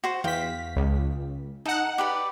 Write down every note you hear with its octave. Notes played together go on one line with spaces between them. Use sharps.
F#4 C5
E2 F5 G5 B6
C#2
D#4 A4 F#5
G4 B4 D5